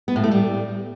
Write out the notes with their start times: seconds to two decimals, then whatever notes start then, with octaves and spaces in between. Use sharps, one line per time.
0.08 B3
0.16 A2
0.24 A3
0.31 G3